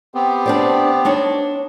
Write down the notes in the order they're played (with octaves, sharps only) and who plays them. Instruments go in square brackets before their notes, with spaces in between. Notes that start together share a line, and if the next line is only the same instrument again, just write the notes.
[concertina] B3 C4 G4
[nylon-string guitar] D4 C5 D5
D4 D#4 C#5